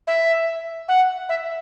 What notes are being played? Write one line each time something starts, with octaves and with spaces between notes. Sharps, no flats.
E5
F#5
E5